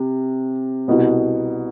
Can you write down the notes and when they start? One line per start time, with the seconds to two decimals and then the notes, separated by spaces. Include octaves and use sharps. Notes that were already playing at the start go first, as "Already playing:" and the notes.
Already playing: C3
0.88 C2 B2 B3